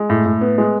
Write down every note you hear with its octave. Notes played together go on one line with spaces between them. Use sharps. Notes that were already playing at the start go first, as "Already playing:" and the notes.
Already playing: G#3
A2
A2
B3
G#3